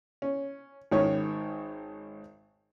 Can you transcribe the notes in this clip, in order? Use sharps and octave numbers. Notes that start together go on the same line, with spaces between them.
C#4
G#1 D#3 C#4 C#5